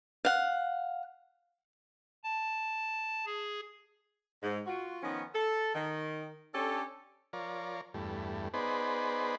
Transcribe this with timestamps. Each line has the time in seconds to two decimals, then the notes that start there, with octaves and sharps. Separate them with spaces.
0.25 F5 F#5
2.24 A5
3.26 G#4
4.43 G#2
4.67 F4 F#4
5.03 D#3 F3 B3 C#4
5.35 A4
5.75 D#3
6.54 C#4 D4 G4 A4
7.33 F3 A#4 C#5 D5
7.94 E2 G2 A3
8.54 B3 D#4 G#4 B4 C5 D5